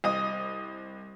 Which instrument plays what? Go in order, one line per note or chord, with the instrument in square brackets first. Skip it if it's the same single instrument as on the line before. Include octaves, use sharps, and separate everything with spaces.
[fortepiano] C2 D#5 D#6